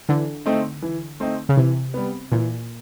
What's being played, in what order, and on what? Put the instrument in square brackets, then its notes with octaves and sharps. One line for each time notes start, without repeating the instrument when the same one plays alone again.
[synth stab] D3 [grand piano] E3
[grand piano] A3 C4 D#4
E3
A3 C4 D#4
[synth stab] C#3
[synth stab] C3 [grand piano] E3
[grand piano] G3 B3
[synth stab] A#2 [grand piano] E3